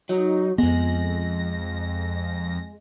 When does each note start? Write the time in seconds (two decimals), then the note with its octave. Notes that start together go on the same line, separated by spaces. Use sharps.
0.09 F#3 D#4
0.58 F2 G#3 B3 A#6